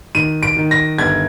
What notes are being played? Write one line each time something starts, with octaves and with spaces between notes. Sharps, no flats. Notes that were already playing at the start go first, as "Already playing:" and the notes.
D#3 D#7
D7
D#3
A#6
G1 G#6